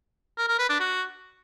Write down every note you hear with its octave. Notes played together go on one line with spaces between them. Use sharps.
A#4
A#4
B4
D4
F#4